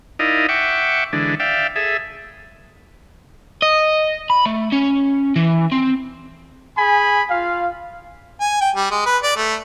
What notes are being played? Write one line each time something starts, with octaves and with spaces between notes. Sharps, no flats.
D#4 E4 A#4 D5 D#5 F5
E5 F#5 G5 C#6 D6
D3 E3 G#3 D4
D5 E5 F5 G5
G#4 A4 E5
D#5
B5
A3
C#4
E3
C4
G#4 G#5 B5
F4 F5
G#5
G5
G3
G#3
B4
D5
A3